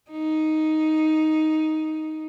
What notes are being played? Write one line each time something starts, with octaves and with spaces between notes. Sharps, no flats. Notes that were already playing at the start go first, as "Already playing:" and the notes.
D#4